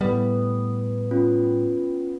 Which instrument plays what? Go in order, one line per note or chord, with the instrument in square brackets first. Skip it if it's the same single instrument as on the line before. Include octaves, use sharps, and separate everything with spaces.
[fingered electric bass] A2 G3 [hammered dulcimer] B3
[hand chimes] C#4 F4